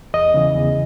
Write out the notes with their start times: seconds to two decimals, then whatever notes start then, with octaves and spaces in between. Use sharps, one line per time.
0.14 E2 D#5
0.34 C#3 E3
0.55 E2